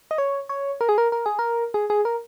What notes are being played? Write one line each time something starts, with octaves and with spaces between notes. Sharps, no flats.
D#5
C#5
C#5
A#4
G#4
A#4
A#4
G#4
A#4
G#4
G#4
A#4